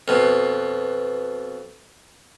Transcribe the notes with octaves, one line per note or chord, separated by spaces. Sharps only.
F2 B2